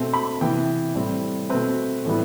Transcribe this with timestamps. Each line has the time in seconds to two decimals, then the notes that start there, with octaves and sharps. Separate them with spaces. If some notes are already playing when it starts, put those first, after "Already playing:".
Already playing: B2 A3 C4
0.13 B5
0.41 C3 E3 B3 G5
0.95 A2 G3 C4
1.49 B2 A3 C4 B4
2.05 A2 E3 G3 B3